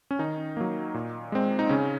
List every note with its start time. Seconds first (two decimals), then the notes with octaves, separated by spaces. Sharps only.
0.11 C#4
0.19 D#3 D#4
0.57 F#3 A#3
0.94 A#2
1.32 G#3 C4
1.59 D#4
1.69 C#3 C#4